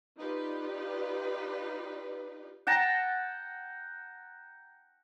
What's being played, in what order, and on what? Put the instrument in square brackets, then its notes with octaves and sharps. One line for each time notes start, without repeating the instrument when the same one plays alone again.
[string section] D#4 F4 G4 B4 D5
[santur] F#5 G5 A5 A#5